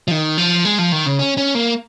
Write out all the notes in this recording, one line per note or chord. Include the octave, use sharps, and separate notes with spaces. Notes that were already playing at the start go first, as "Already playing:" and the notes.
F3
D#3
F3
G#3
F3
D#3
C#3
C#4
C#4
A#3